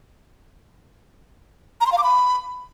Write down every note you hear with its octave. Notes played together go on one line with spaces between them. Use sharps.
A#5
C6
F5
D6
B5